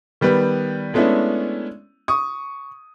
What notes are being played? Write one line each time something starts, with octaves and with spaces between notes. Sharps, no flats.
D#3 G3 B3 B4
G#3 A3 B3 C#4 D4 E4
C#6 D#6